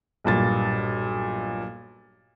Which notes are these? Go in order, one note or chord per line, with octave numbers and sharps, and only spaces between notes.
B1 G2 A#2 A6